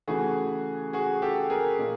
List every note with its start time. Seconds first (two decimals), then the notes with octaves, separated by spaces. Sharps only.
0.08 C#3 E3 A3 F#4 G#4
0.93 F#4 G#4
1.22 G4 A4
1.50 G#4 A#4
1.79 A#2